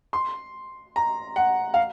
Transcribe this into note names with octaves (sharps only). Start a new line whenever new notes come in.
C6
A#5
F#5
F5